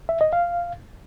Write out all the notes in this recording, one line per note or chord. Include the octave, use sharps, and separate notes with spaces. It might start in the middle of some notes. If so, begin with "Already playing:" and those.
E5
D#5
F5